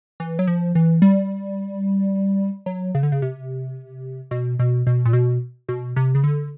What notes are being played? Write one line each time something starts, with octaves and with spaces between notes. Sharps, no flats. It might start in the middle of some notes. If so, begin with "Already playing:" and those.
E3
F#3
F3
E3
G3
F#3
C#3
D3
C#3
C3
B2
B2
B2
A#2
B2
B2
C3
C#3
D3